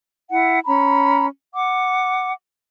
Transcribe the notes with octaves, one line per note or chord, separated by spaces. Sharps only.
E4 F#5
C#4 A#5 B5
F#5 D6